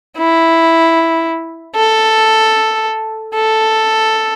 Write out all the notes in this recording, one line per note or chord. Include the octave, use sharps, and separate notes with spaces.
E4
A4
A4